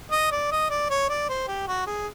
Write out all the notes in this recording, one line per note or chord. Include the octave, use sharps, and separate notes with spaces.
D#5
D5
D#5
D5
C#5
D5
C5
G4
F#4
G#4